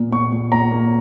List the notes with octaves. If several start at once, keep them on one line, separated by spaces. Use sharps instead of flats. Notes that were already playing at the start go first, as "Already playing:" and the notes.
Already playing: A#2 A#3
A#2 C#6
A#2
A#2 A#5
A#3